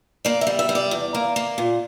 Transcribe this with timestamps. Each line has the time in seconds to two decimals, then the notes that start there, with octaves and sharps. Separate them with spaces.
0.25 A#3 D5
0.41 E5
0.47 G3
0.59 E5
0.69 G3
0.75 D5
0.91 E2
1.15 A#3
1.36 A#3
1.58 A#2